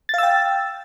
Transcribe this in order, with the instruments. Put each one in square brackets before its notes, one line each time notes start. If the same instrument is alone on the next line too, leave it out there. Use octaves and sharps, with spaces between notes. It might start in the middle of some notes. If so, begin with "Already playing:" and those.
[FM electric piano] A6
F5
E6
G5